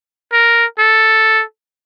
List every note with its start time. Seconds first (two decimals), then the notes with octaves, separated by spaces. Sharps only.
0.33 A#4
0.79 A4